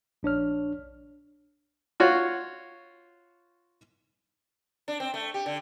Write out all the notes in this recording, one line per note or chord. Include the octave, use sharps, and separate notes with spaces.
A#1 D4 C#5 F6
F4 F#4 C#5
D4
C4
A3
G4
D3